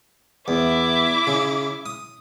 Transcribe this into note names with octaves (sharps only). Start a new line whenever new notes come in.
E2 E4 D6
C#3
D#6